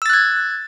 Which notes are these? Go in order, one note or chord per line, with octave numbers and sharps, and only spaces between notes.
E6 F#6 G#6 A6